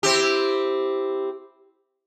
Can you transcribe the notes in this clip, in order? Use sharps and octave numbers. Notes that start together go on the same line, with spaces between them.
C4 E4 G4